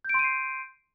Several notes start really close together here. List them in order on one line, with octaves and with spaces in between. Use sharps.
G6 D7 C6 D#7 C7